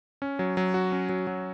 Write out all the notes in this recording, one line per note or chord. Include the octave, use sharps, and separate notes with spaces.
C#4
F#3
F#3
F#4
C#4
F#3
F#3